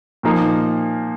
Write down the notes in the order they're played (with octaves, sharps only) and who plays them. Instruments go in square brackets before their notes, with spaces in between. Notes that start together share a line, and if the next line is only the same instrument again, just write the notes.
[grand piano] A#2 F3 A#3 D#4